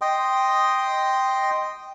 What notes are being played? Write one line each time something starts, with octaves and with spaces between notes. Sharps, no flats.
D#5 G5 C6 D#6